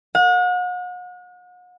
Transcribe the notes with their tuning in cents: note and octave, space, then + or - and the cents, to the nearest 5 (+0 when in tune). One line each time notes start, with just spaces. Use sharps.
F#5 -40